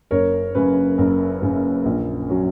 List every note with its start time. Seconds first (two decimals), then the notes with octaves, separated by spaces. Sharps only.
0.11 F#1 A#4 C#5
0.55 F#2 C#3 B4
0.98 F#1 A#4
1.42 F#2 C#3
1.85 A#1
2.29 F#3 C#4